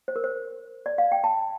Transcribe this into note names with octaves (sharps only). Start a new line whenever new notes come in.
C5
A#4
C5
D5
F5
G5
A5